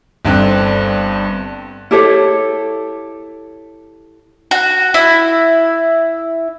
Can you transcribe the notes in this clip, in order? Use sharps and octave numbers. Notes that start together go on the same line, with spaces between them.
G1 G2 C4 F#6
E4 G4 A4 C#5
F#4
E4